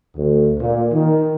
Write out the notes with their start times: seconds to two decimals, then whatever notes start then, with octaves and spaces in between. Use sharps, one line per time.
0.16 D2
0.59 A#2
0.92 D#3